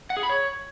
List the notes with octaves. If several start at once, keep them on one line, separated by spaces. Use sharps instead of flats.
F#5
G#4
B5
C#5